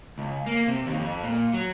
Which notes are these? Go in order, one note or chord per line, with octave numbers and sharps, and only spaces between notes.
C#2
A#3
C3
D#2
F2
A#2
F#3